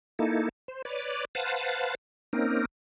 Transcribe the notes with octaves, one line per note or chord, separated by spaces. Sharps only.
A#3 D#4 E4 A4
C5
B4 C#5 D5 D6
B4 C5 F5 F#5 A5
A#3 C4 C#4 D#4 A#4